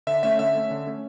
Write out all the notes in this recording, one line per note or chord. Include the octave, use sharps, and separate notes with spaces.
D3 E5
A3 C#4 E5
D3 E5
A3 C#4
D3
A3 C#4